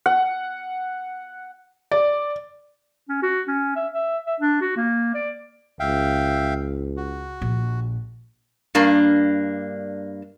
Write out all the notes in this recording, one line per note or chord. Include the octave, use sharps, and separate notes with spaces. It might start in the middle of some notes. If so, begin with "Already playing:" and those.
F#5
D5
C#4
F#4
C#4
E5
E5
E5
D4
F#4
A#3
D5
C#2 E5 F5 G5
F#4
A#1
G2 A#3 D4